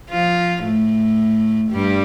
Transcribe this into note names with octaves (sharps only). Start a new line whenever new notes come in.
F3 F4
A2 A3
G2 G3